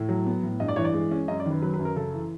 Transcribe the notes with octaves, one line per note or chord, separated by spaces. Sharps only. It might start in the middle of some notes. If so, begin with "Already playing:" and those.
Already playing: A2 A4
F#3
B3
A2
G2 D#5
D5
E3 C#5
D5
G#3
C#4
F#2 D#5
D5
D#3 B4
F#3 B4
B4
F#2
A#4
C#3 A4
E3